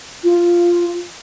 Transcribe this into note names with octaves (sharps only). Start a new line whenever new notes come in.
F4